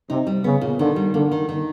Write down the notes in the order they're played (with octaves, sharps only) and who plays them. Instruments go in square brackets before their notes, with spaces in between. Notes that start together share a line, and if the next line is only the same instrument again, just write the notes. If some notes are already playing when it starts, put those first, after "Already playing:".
[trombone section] C3 [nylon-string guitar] D#4
[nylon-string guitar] G3
[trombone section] C#3 [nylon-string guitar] B3
[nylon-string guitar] A#2
[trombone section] D3 [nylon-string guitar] D#3
[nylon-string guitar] G3
[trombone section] D3 [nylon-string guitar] A#3
[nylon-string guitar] D#3
D#3